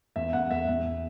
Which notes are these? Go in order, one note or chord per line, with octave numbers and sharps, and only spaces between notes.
E2 E5
E2 F#5
E2 E5
E2